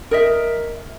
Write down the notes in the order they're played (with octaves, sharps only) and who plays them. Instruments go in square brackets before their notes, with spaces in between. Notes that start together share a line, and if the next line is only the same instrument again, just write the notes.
[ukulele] A#4 D#5 E5